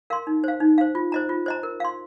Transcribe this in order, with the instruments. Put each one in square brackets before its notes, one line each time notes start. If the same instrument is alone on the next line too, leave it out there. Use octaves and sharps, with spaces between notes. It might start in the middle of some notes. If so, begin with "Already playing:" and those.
[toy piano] A#4 F5 C6
D#4
C5 F5
D#4
C5 F5
F4
C5 D#5 A#5
F4
C5 D#5 A#5
A#4
F5 C6